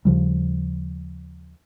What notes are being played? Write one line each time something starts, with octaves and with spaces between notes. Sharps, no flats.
D#2 C#3 F3 G3